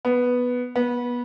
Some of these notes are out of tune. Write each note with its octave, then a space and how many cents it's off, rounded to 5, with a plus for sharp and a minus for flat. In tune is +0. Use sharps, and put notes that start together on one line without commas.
B3 +0
B3 -20